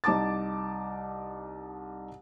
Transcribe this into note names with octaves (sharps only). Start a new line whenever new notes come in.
C2 D#4 A5 D6 A6